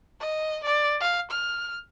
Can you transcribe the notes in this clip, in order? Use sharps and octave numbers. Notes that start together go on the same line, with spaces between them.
D#5
D5
F5
F6